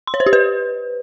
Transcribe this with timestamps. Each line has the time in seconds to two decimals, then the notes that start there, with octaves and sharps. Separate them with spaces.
0.07 C6
0.14 C#5
0.20 C5
0.26 G4
0.33 B4